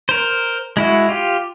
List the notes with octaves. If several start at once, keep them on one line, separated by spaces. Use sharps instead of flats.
A#4 C5
G#3 E4 F#4
F4 G4